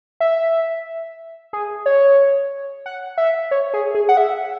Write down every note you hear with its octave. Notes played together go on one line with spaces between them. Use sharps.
E5
G#4
C#5
F#5
E5
C#5
G#4
G#4
F#5
E5